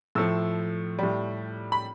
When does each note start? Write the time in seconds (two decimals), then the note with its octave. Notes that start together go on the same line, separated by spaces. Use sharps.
0.15 A2 F3 A3 E6
0.99 A2 G3
1.72 B5